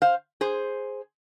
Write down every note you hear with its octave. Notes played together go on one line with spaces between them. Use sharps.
C5 F5
G#4 C5